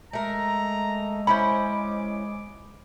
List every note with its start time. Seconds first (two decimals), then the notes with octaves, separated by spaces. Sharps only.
0.13 G#3 A3 A#4 A#5
1.27 C#4 E4 C5 B5 D6